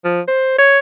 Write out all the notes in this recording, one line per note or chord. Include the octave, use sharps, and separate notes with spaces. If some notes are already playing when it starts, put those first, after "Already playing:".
F3
C5
C#5